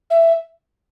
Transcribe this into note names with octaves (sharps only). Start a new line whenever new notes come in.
E5